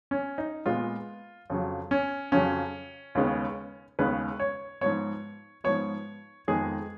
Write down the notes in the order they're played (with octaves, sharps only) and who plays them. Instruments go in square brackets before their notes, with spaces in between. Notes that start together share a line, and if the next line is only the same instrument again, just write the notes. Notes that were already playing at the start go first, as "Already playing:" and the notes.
[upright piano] C#4
D#4
A#2 G#3 B3 F4
F2 C#3 F#3
C#4
F2 C#3 F#3 C#4
D#2 C#3 G#3 B3
D#2 C#3 G#3 B3 B4
C#5
G#2 F3 B3 C#5
G#2 F3 B3 C#5
F2 D#3 G#3 B3 G#4